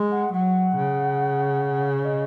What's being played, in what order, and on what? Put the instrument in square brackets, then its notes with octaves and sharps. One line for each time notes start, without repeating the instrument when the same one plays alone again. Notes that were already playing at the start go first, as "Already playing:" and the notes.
Already playing: [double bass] G#3
[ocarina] F#5
[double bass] F#3 [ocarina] F#5
[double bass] C#3
[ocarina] C#5
D#5